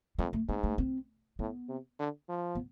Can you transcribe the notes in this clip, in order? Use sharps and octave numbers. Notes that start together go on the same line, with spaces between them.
F2 G#3
A3
G#2 B3
A3
C4
A2 B3
C3
D3
F3
B3